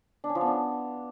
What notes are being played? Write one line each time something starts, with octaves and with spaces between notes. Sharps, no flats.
D4
C#4
F3
B3
D4